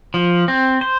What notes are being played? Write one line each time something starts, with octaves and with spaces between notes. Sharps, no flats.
F3
C4
C5